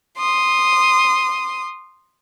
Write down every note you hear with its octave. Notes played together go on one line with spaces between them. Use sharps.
C6 D#6